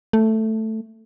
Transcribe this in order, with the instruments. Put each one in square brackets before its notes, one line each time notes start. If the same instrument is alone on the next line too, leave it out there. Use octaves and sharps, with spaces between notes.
[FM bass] A3